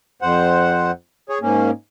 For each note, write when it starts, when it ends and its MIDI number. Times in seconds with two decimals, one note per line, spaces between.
0.22 0.91 41
0.22 0.91 72
0.22 0.91 78
1.29 1.38 68
1.29 1.38 73
1.41 1.70 44
1.41 1.70 58
1.41 1.70 61